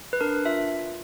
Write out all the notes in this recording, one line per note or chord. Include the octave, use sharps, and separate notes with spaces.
B4
D4 A#4
F4 E5